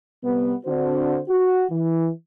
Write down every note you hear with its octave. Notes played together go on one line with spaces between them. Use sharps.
C3 G3 B3
D3 C4 D4 F#4 C5
F#4
E3